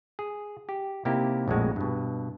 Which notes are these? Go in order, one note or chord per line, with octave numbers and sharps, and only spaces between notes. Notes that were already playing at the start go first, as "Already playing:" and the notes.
G#4
G4
C3 A#3 D#4 E4 G4
A#1 F2 A2 G#3 F#4
G2 B2